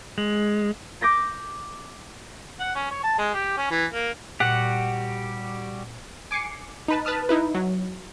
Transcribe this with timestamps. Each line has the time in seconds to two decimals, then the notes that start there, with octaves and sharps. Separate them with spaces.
0.18 G#3
1.01 D6 G6 A#6 B6
2.59 F#5
2.75 C#4
2.91 C#5
3.03 A5
3.18 G#3
3.34 G4
3.57 C#4
3.71 E3
3.92 A#3
4.40 A#2 G3 F#4 G4 F#5
6.31 G#5 D6 C7 C#7
6.88 D#4 B4 A5
7.05 B4 A5 D#6 F6
7.29 D#4 E4 B4
7.55 F#3